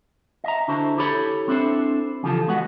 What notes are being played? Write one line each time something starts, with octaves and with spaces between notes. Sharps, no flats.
D#5 E5 A#5
D3 D4 E4 F#4 C5
E4 G4 A4 C#5 B5
C4 D4 E4 A4 C5
C#3 E3 F3 F4 G4 A4
G#3 B3 F#4 B4 D#5 F#5